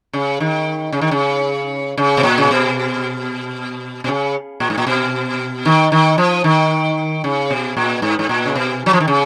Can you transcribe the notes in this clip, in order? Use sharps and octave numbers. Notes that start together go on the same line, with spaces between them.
C#3
D#3
C#3
D#3
C#3
C#3
B2
A#2
C#3
B2
B2
C#3
A#2
G#2
A#2
B2
D#3
D#3
F3
D#3
C#3
B2
A#2
G#2
G#2
A#2
C#3
B2
F#3
F3
D#3
C#3